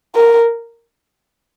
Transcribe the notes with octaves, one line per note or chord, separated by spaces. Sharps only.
A#4